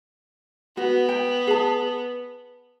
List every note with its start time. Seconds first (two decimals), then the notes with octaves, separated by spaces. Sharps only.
0.77 B3 F#4
1.09 G5
1.47 G#4 A5